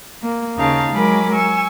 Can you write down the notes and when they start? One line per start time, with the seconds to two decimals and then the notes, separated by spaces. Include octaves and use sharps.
0.20 A#3
0.56 D#2 C#3 D#4 F5 A5
0.90 F#3 G#3 A#4 G#5 B5 D6
1.34 G#5 C#6 E6